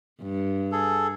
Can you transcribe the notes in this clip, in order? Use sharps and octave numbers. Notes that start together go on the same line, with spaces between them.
G2
G#4 A4